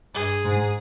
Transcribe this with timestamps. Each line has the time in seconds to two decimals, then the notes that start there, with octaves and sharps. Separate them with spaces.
0.15 G2 G#4
0.45 G#2